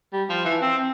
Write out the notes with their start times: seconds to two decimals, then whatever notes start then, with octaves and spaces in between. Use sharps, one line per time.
0.13 G3
0.29 F3
0.45 E3
0.61 C4